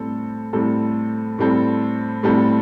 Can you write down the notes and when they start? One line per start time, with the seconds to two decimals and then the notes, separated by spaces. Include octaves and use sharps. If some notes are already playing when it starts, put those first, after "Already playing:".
Already playing: A2 G3 C4 A4
0.53 A2 G3 C4 A4
1.38 A2 G3 C4 A4
2.23 A2 G3 C4 A4